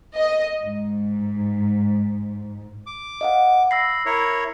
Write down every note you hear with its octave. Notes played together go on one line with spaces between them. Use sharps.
D#5
G#2
D6
D#5 F5 F#5
B5 E6 A#6 C7
E4 A#4 C#5